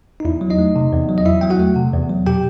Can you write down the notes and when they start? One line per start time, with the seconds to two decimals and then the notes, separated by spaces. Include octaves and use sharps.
0.20 D#4
0.25 E2 E4
0.41 F#3
0.50 D#4 D#5
0.58 A3
0.76 C3
0.92 E2
1.09 F#3
1.18 D#5
1.26 E2 E4 E5
1.41 F#3 G5
1.50 F#4 F#5
1.60 A3
1.76 C3
1.94 E2
2.09 F#3
2.26 B2 G4 G5